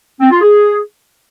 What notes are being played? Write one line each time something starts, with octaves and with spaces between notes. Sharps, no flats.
C4
F4
G#4